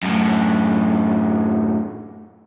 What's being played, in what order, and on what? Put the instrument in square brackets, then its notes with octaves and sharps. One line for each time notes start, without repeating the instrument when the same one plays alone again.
[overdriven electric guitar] F#2 A2